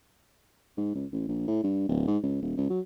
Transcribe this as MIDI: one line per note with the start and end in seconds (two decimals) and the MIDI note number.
0.77 0.93 44
0.95 1.06 37
1.12 1.25 33
1.28 1.43 34
1.48 1.60 45
1.64 1.88 43
1.88 2.06 26
2.07 2.18 44
2.23 2.41 37
2.42 2.57 27
2.57 2.66 37
2.70 2.80 54